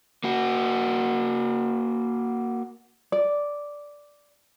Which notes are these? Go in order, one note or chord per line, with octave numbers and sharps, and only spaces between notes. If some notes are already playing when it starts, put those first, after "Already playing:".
A#3 F#4
D5